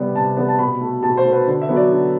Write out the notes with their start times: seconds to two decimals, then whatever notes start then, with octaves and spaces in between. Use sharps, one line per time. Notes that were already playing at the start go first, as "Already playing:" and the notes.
Already playing: C3 G3 B3
0.15 C3 A5
0.37 G3 B3
0.48 A5
0.59 B2 B5
0.81 A3
1.03 B2 A5
1.17 C5
1.25 A3
1.32 B4
1.47 D3
1.62 E5
1.69 F#3 B3
1.76 D5
1.91 D3